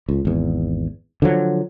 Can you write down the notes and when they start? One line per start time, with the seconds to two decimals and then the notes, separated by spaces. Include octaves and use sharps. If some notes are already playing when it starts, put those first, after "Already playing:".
0.09 C#2
0.25 G#1 E2
1.22 D3 F3 F#3